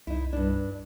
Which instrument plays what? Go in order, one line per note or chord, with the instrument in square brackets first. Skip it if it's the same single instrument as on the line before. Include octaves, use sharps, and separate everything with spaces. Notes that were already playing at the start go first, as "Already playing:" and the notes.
[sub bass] C2 [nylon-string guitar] D#4 E4
[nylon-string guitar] G2 D4